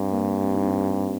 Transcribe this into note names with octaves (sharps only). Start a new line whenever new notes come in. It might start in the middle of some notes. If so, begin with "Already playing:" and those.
Already playing: G2 C4 G4
A#3
C4
D#4
C4